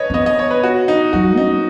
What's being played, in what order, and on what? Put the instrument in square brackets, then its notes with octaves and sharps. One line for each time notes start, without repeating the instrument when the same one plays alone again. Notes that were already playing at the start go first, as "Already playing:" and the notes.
Already playing: [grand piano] B4 C#5 D#5
[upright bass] C#4
[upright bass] B3 [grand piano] D#5
[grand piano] D#5
C#5
B4
F#4
D#4
[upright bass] F#3 [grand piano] F#4
[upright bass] C#4 [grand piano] D#4